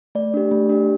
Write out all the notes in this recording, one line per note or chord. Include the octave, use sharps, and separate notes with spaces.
A3 D5
D4 G4
A3
D4 G4